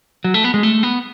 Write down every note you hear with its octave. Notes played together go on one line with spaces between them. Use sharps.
F#3
A3
B3
G#3
A3
B3